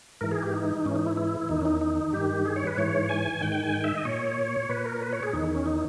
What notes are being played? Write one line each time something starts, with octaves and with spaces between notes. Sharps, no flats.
G#2 E3 A#4
G#4
G4
D#4
G#2 E3 C#4
D#4
E4
E4
E2 D#3 D#4
C#4
D#4
D#4
G2 D#3 G4
G#4
C#5
B4
G#2 E3 C#5
G#5
G#2 D#3 G5
G5
G#5
G5
E5
D#5
A#2 C#5
A#2 B4
A#4
B4
C#5
G#4
E2 D#3 D#4
C#4
D#4